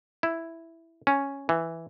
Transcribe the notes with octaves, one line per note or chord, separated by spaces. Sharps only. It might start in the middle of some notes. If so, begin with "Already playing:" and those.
E4
C#4
E3